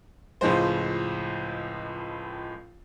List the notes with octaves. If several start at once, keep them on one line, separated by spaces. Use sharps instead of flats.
C#2 A2 F3 G#3 C5